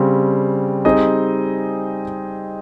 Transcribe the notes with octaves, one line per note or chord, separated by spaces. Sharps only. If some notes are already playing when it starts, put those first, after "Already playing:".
Already playing: C#3 G3 C4
G3 C4 D#4 G#4 D#5